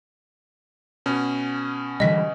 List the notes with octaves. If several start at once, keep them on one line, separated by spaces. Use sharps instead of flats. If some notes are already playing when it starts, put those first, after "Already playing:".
B2 C#4
D3 E3 G3 D#5 B6